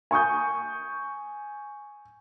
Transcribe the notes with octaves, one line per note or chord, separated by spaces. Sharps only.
G#5 C#6 D#6 G6